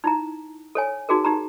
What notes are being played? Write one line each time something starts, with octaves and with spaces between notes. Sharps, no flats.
D#4 E4 A#5
A4 C#5 G#5
D#4 F#4 G#4 A#4
D#4 G4 A#5